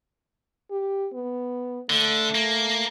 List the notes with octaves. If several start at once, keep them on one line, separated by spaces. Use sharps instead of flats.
G4
B3
D3 A3
A#3